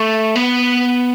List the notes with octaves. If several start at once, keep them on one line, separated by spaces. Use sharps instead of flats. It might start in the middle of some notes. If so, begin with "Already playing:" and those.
Already playing: A3
B3